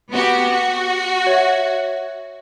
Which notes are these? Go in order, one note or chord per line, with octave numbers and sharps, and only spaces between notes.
B3 F#4 G4
F#4
C#5 E5